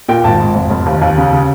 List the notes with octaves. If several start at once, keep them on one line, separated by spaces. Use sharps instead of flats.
A#2 G5
G#1 A5
G#2
F1
F1
D#2
D#2
C#3
C#3